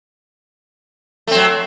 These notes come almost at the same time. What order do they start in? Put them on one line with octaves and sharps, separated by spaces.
A3 C4 F#3